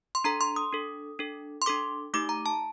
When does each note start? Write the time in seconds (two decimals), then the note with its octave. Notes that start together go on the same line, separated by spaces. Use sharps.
0.15 C6
0.24 D4 A4 A#5
0.41 C6
0.56 D#6
0.73 D4 A4
1.19 D4 A4
1.62 C6
1.66 D4 A4 D6
2.14 A3 D#4 G4 D6
2.29 A#5
2.46 A5